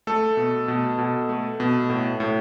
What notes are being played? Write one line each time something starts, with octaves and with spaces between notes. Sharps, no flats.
A3 A4
B2
B2
B2
A3
B2
A2
A2